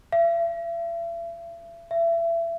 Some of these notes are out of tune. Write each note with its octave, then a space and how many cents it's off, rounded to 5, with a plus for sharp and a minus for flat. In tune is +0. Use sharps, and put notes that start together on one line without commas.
E5 +40
E5 +30